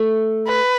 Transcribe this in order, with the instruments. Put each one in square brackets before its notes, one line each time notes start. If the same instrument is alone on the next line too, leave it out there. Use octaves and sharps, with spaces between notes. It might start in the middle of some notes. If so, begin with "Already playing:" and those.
Already playing: [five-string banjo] A3
[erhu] B4